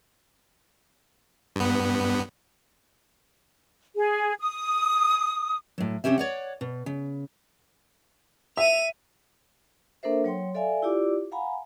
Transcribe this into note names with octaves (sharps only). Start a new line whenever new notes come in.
G2 B3
G#4
D#6
A2 F#3
C3 C4 C#4 G4 E5
C#5 D5 F#5
B2
C#3
E5 D#7 F7
A#3 D4 A4 A#4 C5 E5
F#3 C#5 G5 C6
A4 D5 E5 F5 G#5
E4 F4 G4 D5 D6
F5 F#5 G#5 A#5 B5